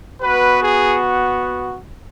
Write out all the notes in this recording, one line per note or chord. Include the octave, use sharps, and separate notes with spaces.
B3 F#4 B4
G#4